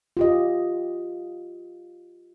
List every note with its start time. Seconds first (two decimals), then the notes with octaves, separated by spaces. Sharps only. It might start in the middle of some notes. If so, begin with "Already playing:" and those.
0.17 F4 G4 D#5